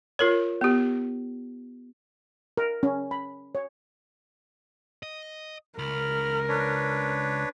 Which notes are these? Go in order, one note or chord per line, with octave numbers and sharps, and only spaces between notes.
F4 A#4 C#5
B3 G4
A#4
C#4
B5
C#5
D#5
C#2 A#4 B5 F6
D4 B4 C#5